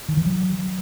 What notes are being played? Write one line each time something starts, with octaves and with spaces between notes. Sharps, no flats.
D#3
E3
F#3